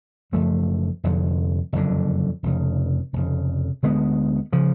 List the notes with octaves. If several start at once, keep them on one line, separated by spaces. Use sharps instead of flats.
F#1 F#2 F3 A3
F1 F2 D3
F#1 F2 D3
F1 F2 C#3
F1 F2 C#3
D2 D3 G#3 B3
C#3 F3